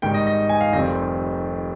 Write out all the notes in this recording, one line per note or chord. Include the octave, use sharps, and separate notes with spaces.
G#1 G#2 D#3 G3 G5
D#5
D#5
G#5
F5
F1 F2 D#3 G3 C4 D#5